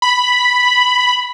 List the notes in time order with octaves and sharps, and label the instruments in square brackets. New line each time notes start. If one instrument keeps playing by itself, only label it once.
[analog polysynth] B5